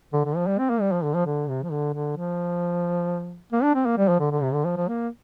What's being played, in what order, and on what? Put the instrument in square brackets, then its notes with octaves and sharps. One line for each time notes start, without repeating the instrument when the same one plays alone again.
[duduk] D3
D3
F3
G3
C4
A#3
G3
F3
D3
F3
D3
C3
F3
D3
D3
F3
A#3
D4
C4
A#3
G3
F3
D3
D3
C3
D3
F3
F3
A#3